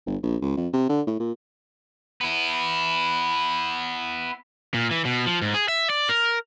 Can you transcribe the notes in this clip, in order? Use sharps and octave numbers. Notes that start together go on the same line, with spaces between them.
G1
A#1
C#2
F2
C3
D3
A2
A#2
B3 E4
A#2
E3
B2
F3
G#2
G#4
E5
D5
A#4